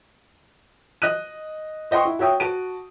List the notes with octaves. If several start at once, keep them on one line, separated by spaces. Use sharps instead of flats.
D#5 D#6 F#6 D#7
C5 D#5 F#5 G5 C6 C#6
E4
F#4 C#5 E5 G5 D#6
F#4 A5 D7 D#7